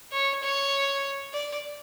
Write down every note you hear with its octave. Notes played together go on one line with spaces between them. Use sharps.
C#5
C#5
D5